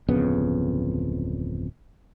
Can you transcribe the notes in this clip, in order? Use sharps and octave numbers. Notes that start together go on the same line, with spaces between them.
D1 F2 C#3 B3